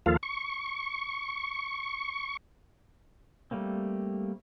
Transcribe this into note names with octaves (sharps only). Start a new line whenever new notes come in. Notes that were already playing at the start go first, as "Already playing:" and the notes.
D#2 F3 A#3 F4 A4 F5
C#6
G3 A3 A#3 C4